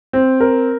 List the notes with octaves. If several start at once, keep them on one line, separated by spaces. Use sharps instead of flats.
C4
A#4